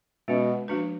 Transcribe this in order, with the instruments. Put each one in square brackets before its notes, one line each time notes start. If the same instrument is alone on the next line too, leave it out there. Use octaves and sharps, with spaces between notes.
[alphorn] B2 [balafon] G#3 C#4 F#4
[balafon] F3 A#3 D4 F#4 B4